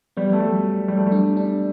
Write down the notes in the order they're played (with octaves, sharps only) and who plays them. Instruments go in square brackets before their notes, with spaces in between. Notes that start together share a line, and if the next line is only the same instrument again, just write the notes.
[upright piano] G3 [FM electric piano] B3
[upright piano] A3
[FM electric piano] F#3 [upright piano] G3
[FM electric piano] F#3
[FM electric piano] F#3 [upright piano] G3
[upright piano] A3
G3
[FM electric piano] D4
D4